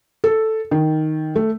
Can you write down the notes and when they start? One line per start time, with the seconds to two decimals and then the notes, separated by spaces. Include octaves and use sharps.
0.24 A4
0.71 D#3
1.36 A3